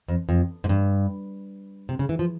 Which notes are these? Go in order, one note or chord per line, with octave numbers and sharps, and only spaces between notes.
F2
F2
G#2
G2
C3
C#3
E3
F3